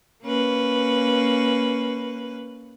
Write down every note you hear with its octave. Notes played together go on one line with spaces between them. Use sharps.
A#3 C#4 B4